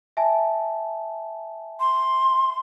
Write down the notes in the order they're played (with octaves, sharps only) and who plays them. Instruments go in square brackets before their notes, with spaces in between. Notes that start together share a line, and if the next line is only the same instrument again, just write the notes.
[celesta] E5 G#5 A5
[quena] C6